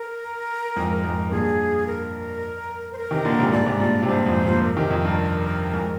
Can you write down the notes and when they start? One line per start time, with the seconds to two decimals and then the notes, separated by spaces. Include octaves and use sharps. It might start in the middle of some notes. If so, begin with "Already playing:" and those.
Already playing: A#4
0.76 F2 G#2
1.04 F2 G#2
1.31 G2 A#2 G#4
1.87 A#4
2.93 C5
2.98 A#4
3.11 C3 D#3
3.25 A#2 D3
3.38 G#2 C3
3.52 G2 A#2 D5
3.66 G#2 C3
3.80 G2 A#2
4.02 C3
4.08 G2 A#2 C5
4.26 F2 G#2
4.44 G2 A#2
4.63 A#4
4.77 C3 D#3
4.90 F2
5.05 G2
5.73 F2 G#2